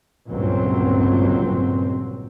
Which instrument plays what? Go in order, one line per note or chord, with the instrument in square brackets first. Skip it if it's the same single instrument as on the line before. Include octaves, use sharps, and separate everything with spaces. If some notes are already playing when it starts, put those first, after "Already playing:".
[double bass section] G1 C#2 A#2 F#3 C4